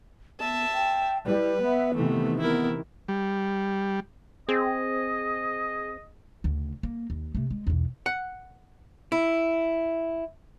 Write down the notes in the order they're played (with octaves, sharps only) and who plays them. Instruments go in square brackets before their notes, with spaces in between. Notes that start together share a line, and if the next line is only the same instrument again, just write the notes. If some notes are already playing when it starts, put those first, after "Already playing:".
[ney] B3 [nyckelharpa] E5 A5
[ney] G5
[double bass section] G3 [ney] E4 [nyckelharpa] B4
[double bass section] B3 [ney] E5
[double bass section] C3 D#3 E3 [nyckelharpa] A3 [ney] B3
[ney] B3 [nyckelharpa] E4 A#4
[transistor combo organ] G3
[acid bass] C4 [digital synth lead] G#4 [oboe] D#5
[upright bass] D2 C#3
A#3
D#2
C3 A3
G#3
B1 E2
[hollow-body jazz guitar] F#5
E4